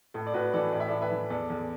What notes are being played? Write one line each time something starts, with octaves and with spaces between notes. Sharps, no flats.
A2 A4
D5
A2 F#4 B4
E3 A4 D5
A2 D5
E5
A2 A4 D5
B4 E5
E3
E2 A4 D5
E2